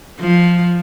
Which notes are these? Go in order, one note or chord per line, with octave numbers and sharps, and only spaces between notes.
F3